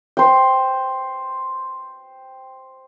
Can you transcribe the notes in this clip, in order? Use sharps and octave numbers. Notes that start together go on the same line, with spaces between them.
C5 G5